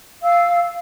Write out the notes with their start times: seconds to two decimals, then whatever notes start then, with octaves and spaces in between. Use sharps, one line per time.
0.23 F5 E6